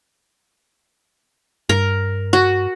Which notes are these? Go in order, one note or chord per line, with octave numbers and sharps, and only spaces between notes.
G2 A#4
F#4